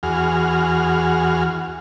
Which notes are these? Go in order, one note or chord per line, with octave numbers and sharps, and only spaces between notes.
E2 F#4 G#4 F6